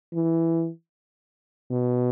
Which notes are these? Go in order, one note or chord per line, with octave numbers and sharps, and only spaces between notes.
E3
B2